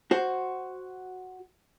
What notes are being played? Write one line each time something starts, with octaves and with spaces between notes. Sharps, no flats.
F#4 C5